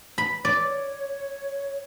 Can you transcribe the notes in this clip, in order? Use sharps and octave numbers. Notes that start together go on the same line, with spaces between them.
B5
C#5 D5